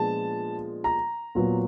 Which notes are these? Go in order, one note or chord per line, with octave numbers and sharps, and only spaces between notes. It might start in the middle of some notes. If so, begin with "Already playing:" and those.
Already playing: A#2 F3 G#3 B3 D4 A5
A#5
A#2 F#3 B3